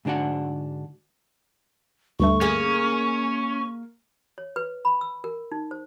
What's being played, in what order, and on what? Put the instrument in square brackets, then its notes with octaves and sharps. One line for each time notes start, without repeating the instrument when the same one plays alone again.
[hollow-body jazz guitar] G#2 D3 D4 F#4 F#5
[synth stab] D2 G2 A3 [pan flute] C#6
[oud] A#3 G#4 [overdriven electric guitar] C#4
[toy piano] C#5
B4
B5
E6
A#4
D#4
C5